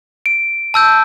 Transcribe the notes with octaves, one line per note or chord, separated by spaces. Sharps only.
D7
A5 E6 G6